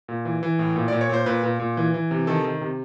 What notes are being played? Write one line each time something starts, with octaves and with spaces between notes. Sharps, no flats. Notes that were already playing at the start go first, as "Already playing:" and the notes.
A#2
E3
E3
A2
A#2
A#2 D5
C#5
A#2 C5
A#2 B4
A#2
A#2
E3
E3
C3
D#3 A4
D#3
C3